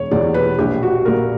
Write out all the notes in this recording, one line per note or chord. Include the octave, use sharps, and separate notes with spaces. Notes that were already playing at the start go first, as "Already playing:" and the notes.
Already playing: E1 C#5
E2 B2 G3 D5
B4
A#1 G4
F#4
A#2 G3 A#4